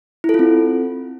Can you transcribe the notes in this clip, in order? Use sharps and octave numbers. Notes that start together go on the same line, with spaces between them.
E4
A4
F4
C4